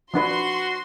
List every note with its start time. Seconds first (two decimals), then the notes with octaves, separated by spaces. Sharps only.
0.14 F3 D4 F#4 B4 C6